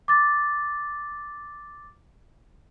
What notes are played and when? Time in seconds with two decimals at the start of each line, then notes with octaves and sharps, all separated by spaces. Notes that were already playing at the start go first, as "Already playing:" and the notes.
0.08 D6 A6